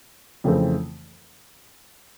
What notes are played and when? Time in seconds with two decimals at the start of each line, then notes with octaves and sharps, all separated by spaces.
0.44 F2 C#3 E3 A3 C4